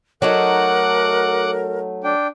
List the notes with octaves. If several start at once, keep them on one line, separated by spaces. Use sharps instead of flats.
F#3 A3 D#4 A#4 F#5 D6 F#6
D4 G5